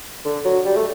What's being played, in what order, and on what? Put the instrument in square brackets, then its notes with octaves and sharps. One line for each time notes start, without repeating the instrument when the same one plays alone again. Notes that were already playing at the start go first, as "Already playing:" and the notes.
[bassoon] D3
F#3
G3
A3